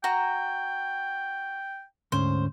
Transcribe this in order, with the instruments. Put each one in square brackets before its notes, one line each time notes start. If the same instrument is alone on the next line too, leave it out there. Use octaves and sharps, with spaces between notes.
[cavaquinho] F#4 A#5 [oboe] G5
[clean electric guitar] D2 G#2 C#4 [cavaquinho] C5